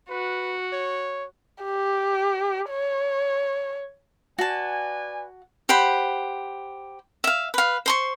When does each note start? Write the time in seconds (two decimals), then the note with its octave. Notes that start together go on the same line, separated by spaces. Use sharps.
0.10 F#4 B4
0.73 C#5
1.64 G4
2.70 C#5
4.38 F#4 B4 D5 G#5 A5
5.69 G4 C5 F#5 B5
7.24 E5 F5
7.54 B4 F5
7.86 C5 C6 C#6